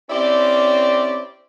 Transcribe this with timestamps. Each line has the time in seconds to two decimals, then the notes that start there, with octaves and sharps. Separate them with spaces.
0.10 C4 C#4 E4 G4 D5